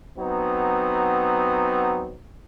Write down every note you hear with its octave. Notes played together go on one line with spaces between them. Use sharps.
F#3 B3 C4 D#4